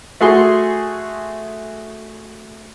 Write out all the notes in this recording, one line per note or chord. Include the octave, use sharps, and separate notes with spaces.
A3 F#4 G#4 C6